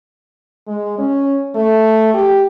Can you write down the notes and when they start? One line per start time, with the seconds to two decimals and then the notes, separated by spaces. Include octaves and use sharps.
0.67 G#3
0.98 C#4
1.55 A3
2.14 G4